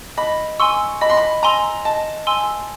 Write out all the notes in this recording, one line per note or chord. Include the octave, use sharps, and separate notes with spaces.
D#5 B5
G#5 C6 C#6 E6
D#5 B5
C6
B5
G#5 A#5 C6 E6
D#5 A5
G#5 C6 E6